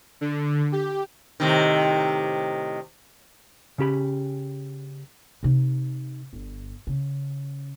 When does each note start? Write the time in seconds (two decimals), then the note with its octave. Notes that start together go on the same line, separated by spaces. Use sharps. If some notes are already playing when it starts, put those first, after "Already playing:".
0.21 D3
0.72 G4
1.40 A2 C3 D#3
3.78 C#3 C#4 G4 B5
5.43 C3 D#4
6.33 G1
6.87 C#3